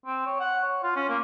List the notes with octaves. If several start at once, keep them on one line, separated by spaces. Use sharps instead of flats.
C4
C#5
F#5
C#5
F4
C#4
A#3